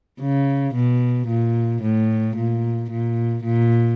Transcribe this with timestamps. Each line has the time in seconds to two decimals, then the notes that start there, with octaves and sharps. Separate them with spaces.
0.21 C#3
0.75 B2
1.28 A#2
1.82 A2
2.37 A#2
2.91 A#2
3.44 A#2